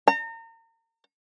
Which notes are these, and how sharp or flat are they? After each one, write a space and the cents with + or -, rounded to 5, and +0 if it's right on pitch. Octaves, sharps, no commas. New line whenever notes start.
A#5 -35